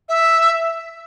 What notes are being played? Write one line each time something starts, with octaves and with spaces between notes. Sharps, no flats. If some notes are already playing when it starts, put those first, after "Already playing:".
E5